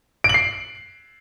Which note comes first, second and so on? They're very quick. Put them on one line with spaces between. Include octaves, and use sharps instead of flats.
D7 F#7 C7